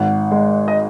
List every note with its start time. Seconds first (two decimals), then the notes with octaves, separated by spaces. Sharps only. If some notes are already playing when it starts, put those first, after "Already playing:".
Already playing: G#1 F#5
0.32 G#3
0.68 D#5